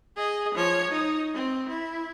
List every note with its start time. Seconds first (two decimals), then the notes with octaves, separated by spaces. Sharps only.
0.16 G#4 D#5
0.54 F3 C#5
0.90 D#4
1.34 C4
1.69 E4